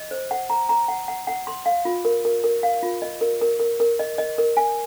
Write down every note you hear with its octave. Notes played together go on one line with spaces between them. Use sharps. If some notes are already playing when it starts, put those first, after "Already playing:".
Already playing: D#5
C5
F#5
A#5
A#5
F#5
F#5
F#5
C6
F5
F4
A#4
A#4
A#4
F5
F4
D#5
A#4
A#4
A#4
A#4
D#5
D#5
A#4
G#5